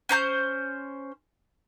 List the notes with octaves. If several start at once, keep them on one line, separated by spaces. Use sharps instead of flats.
C#4 C5 A#5 G6